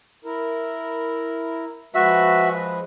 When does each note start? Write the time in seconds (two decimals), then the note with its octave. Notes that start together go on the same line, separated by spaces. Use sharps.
0.25 E4 A#4
1.95 F3 G#3 F#4 B4 E5